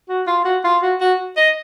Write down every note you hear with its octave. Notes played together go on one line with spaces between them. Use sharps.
F#4
F4
F#4
F4
F#4
F#4
D#5